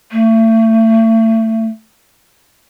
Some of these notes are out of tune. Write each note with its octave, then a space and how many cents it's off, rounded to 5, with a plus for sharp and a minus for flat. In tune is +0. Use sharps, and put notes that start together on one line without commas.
A3 +30